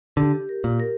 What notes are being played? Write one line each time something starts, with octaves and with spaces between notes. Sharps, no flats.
D3 G4
A#4
A#2
A#4